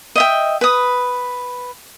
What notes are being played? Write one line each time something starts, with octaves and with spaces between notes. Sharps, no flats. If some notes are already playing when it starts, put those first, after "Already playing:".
D#5 E5 G5
B4 D#6